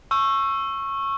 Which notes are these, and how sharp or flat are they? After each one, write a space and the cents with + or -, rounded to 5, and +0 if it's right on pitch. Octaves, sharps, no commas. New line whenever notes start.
C#6 -15 E6 +20